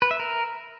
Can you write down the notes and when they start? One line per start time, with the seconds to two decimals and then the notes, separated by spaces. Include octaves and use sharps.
0.02 B4
0.11 E5
0.20 A#4